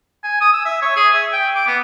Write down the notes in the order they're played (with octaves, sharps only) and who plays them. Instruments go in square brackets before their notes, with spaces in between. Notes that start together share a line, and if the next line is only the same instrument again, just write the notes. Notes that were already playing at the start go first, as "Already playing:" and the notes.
[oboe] G#5
D#6
E6
E5
C#5
G#4
E5
G5
D6
B3